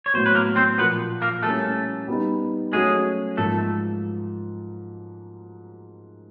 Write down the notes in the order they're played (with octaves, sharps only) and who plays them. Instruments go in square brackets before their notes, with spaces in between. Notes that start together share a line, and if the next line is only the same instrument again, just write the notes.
[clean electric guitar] C#5
[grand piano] A2 F#3 B3 [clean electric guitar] C5
[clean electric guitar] B4
A#3 A#4
C4 C5
[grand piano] A#2 F3 A#3 [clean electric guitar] B3 B4
[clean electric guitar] A#3 A#4
[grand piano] G3 A#3 C#4 E4 [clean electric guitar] A3 A4
[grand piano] G3 B3 D#4
[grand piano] F#3 A3 C#4 F#4 [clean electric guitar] G#3 G#4
[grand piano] G#2 F3 A#3 [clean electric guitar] A3 A4